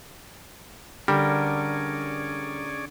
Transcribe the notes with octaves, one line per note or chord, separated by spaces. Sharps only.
D3 G3 C#4 G#4 A#4 D5